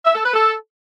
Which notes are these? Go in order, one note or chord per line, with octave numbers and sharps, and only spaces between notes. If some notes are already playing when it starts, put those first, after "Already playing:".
E5
A4
B4
A4